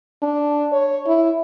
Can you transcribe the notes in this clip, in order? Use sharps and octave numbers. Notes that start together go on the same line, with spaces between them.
D4
C#5
E4